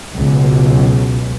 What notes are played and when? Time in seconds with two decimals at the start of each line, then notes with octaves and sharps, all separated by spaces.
0.18 C#2 B2 F#3